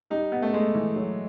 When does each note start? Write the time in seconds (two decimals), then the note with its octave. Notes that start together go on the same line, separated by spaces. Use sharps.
0.10 G3 D#4
0.32 B3
0.42 A3
0.53 G#3 A3
0.75 E3
0.96 F#3